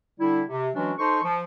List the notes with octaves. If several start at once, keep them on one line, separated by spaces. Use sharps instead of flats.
D3 G3 D4 E4
C3
E3 F#3 G#3 C#4 D4 F#4
D#4 A4 C5 C6 C#6
F3